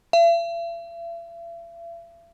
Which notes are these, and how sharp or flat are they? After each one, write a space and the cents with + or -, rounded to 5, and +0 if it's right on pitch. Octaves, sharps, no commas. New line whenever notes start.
E5 +45